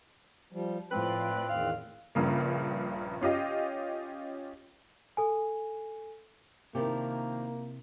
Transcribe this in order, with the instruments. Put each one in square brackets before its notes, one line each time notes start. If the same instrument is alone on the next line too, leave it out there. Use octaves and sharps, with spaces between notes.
[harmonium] F3 G3
[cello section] A2 F4 D5 [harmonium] F3 [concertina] C4 F#6 [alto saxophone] B4
[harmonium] E2 D#3 [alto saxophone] F5
[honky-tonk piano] A#1 G2 C#3 A#3
C#4 F4 G4 D#5
[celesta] A4 G#5
[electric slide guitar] C3 E4 [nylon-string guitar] D#3 F3 G4 [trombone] A#3